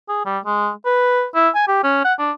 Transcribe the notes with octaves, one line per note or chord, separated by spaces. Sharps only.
G#4
G3
G#3
B4
E4
G#5
G4
C#4
F#5
D4